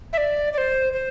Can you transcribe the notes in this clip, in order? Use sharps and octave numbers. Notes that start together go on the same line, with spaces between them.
E5
D5
D5
C5
C5